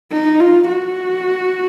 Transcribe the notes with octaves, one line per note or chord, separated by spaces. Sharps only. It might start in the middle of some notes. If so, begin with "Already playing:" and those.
D#4
F4
F#4